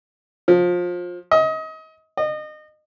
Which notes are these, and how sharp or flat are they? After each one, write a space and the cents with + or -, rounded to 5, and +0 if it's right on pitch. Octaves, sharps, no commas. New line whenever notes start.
F3 +25
D#5 +30
D#5 -30